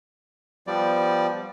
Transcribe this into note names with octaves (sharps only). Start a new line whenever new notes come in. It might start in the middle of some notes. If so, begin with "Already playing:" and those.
F3 G3 B3 D5